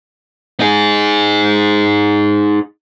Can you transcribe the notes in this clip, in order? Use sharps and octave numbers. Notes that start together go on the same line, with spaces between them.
D#4 G#4